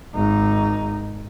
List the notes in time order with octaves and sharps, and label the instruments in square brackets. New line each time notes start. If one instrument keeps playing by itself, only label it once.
[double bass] G#1 D#4